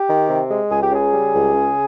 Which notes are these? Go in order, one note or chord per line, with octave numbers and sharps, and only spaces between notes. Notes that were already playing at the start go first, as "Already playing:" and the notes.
Already playing: G4
D#3
C3
G#3
C#2 G#4
G4
C#3 G#4
G3
C#2
C#3